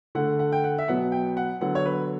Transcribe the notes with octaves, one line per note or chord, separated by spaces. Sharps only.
D3 A3 F#5
F#5
G5
F#5
E5
B2 F#3 B3 F#5
G5
F#5
D3 F#3 B3 F#5
C#5
B4